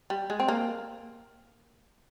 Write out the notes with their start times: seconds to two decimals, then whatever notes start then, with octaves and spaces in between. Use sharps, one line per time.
0.10 G3
0.30 G#3
0.40 C4
0.48 A#3